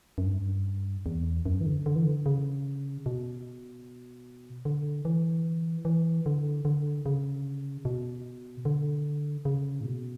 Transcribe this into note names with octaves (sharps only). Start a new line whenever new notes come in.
F#2
G2
E2
F#2
E3
D3
D3
E3
D3
C#3
B2
D3
E3
E3
D3
D3
C#3
B2
D3
C#3
A2
B2